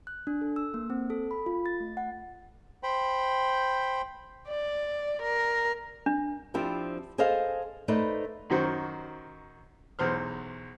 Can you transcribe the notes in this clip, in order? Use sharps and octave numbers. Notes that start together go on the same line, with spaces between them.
F#6
D4
A4
E6
A#3
C4
A4
B5
F4
A6
A3
F#5
C5 G5 B5
D5
A#4
D4
F3 C4 D4 E4 G4
G#4 A4 C5 D#5 F5 A5
A3 D#4 B4 C5 D5
F#2 D#3 F#4 C5
B1 E2 C5 F6